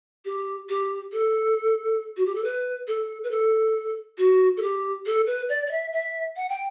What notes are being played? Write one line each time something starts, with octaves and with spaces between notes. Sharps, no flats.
G4
G4
A4
F#4
G4
A4
B4
A4
B4
A4
F#4
A4
G4
A4
B4
D5
D5
E5
E5
F#5
G5